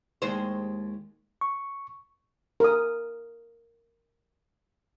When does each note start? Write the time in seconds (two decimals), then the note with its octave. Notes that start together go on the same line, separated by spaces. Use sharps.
0.22 D#2 G#3 C5
1.41 C#6
2.60 A#4 D#6